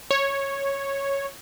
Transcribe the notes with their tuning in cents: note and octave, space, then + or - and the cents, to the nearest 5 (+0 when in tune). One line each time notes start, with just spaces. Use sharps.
C#5 -5